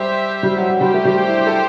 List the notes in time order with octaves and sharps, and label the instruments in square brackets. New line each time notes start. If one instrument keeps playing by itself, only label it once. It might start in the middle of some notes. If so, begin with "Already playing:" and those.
Already playing: [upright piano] G3 [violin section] G4 C5 E5
[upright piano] G3
F#3
F#3
[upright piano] G3 [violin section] G4 C5 G5
[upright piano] A3
G3
E4
A4